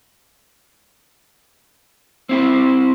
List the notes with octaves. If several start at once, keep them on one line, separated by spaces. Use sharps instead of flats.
C4 E4 G4